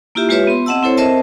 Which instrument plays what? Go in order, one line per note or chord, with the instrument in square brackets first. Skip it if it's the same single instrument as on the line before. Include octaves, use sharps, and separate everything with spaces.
[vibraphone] A#3 E4 F4 G4 E5
G#3 F4 G4 B4 C#5 E5
B3 C6
C4 D#5 F#5 A5 E6
C4 E4 A4 C5 C#5
C4 A#4 C5 D#5 E5 A5